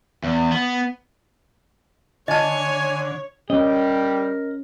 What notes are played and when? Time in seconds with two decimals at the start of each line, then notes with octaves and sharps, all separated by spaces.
0.24 E2
0.52 B3
2.28 D3 C#5 D#5 G#5 A5
3.50 G3 C#4 G4 A#4 D#5